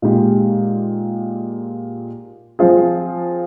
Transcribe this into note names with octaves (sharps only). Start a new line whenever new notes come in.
A#2 G#3 D#4 G4
F3 C4 F4 G#4